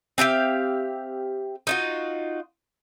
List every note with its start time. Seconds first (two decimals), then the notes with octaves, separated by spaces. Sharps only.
0.18 C4 G4 E5 F5
1.67 D#4 F4 F#4